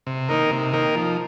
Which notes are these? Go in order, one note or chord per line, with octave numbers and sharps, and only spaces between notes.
C3
D#3 A#3 D#4 A#4
C3
D#3 A#3 D#4 A#4
F3